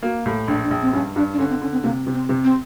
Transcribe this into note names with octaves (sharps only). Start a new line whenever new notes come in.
A#3 F#4
A2 G4
A#1 D4
D4
A#1
C4
G2 C#4
G2 D4
D4
D3 C#4
C4
D3 C#4
C4
C3 A#3
C3
C4
C3
C4